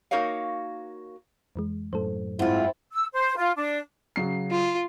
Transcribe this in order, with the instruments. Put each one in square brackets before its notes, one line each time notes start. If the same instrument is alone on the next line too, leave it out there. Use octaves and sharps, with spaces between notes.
[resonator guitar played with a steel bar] A#3 D#4 F#4 A#4 C#5 F5
[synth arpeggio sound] F2 E3 G#3
[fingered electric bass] F#2 A2 [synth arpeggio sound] A4 C5
[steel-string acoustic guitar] G#2 F4 [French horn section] C4 E4
[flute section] E6
C5
F4
D4
[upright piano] C#3 F#3 C7
[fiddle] F4